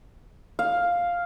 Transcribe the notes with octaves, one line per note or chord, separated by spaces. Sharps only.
F5